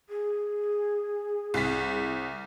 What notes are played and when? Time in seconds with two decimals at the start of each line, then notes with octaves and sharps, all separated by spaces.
0.09 G#4
1.54 C2 B6